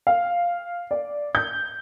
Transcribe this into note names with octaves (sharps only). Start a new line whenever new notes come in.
F5
D5
G6